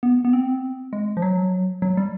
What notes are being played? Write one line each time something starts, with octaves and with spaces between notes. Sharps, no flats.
B3
B3
C4
G#3
F3
F#3
F#3
G3